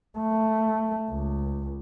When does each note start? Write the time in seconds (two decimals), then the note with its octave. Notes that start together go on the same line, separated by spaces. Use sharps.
0.19 A3
1.10 C#2